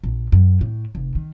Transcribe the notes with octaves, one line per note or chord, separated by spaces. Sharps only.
A#1
F#2
A2
F1
D#3